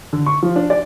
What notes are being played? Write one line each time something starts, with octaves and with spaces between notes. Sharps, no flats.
D3
C#6
F3
D4
D5